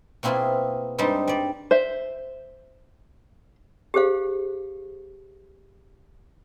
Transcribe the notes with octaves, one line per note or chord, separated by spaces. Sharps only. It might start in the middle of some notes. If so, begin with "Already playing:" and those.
B2 A#3 C4 E4 F4 G#4
G2 G3 G#3 C4 D#4 A5
G3 D5
C5 E5
G4 G#4 C5 F5